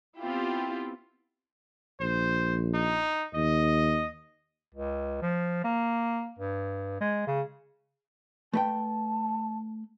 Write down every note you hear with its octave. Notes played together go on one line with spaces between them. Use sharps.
B3 C4 E4 F4 G4
A#1 C5
D#4
D#2 D#5
C#2
F3
A#3
G2
G#3
C#3
A3 B4 G5 A5